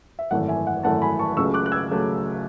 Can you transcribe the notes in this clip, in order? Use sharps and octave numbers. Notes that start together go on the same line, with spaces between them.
E5
G#1 F#2 E3 A3 F#5
E5 G#5
F#5
G#1 F#2 E3 A3 F#5 A5
G#5 B5
A5 C#6
C#2 C#3 F#3 A3 C#6 E6
D6 F#6
F#6
E6 G#6
C#3 F#3 A3